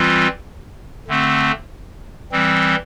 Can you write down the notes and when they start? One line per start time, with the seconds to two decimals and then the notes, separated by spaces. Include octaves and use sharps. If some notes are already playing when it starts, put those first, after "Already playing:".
Already playing: E3 G3 C4 F4
1.08 D3 A3 C4
2.32 E3 G3 C4